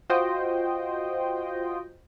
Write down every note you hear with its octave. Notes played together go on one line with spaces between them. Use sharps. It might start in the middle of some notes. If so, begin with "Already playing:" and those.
F4 F#4 C5 D#5 G5